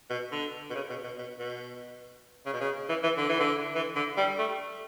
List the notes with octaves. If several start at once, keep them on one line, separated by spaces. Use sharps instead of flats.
B2
D3
B2
C#3
B2
B2
B2
B2
C#3
B2
C#3
E3
E3
D3
E3
D3
E3
D3
G3
A3